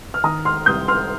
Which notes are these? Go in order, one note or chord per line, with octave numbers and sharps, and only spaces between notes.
F6
D#3 A#5 D#6
C6 F6
C2 D#6 G6
C6 F6